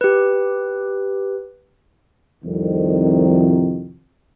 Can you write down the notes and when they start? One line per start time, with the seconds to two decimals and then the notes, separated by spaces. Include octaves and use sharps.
0.01 G4 B4
2.44 C2 F2 D#3